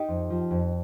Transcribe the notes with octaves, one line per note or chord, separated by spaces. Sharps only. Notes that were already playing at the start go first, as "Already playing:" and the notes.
Already playing: D#4 G4
F2
F3
F2